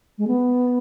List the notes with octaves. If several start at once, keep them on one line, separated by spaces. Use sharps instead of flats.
G#3
B3